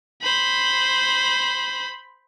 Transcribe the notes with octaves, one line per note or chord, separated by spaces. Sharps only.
C5 B5